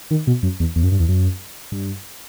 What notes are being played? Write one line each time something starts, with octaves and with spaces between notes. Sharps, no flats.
D#3
B2
F#2
E2
E2
F#2
G2
E2
F#2
G2